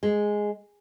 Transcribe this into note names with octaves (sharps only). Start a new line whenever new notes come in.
G#3